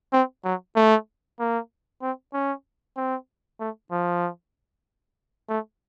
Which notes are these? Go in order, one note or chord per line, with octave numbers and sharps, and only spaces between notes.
C4
F#3
A3
A#3
C4
C#4
C4
A3
F3
A3